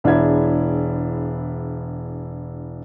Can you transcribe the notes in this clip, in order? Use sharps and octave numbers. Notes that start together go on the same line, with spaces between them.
E1 D4 E4 G#4 E5 G#6